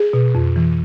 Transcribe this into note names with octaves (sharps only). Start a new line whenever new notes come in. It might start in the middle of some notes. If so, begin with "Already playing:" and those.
Already playing: G#4
B2
F2
E3